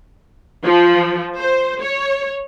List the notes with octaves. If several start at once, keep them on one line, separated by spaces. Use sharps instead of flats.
F3
C5
C#5